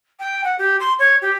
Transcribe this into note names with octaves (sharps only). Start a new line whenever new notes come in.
G5
F#5
G4
C6
C#5
G4